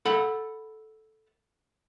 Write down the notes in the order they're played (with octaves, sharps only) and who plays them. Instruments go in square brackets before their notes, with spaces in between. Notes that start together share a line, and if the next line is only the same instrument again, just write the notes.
[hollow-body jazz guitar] A4 F#5 B5